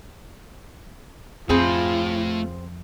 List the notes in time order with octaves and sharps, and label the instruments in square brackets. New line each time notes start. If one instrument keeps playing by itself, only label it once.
[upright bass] F2 [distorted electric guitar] A3 B5 [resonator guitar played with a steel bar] C4 G#4 [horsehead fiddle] F4